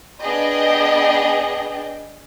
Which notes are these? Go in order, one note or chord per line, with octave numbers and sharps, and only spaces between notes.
B3 D4 G#4 D5 D#5 G5